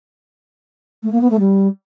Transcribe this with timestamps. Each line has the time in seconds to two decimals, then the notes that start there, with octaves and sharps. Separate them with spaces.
1.03 A3
1.12 A#3
1.21 B3
1.30 A3
1.39 G3